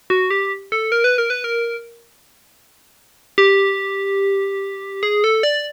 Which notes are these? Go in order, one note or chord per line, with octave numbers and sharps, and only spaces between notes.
F#4
G4
A4
A#4
B4
A#4
B4
A#4
G4
G#4
A4
D5